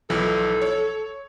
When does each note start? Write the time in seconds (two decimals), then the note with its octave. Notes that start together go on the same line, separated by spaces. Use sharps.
0.10 B1 E3 F3 A4
0.62 C#5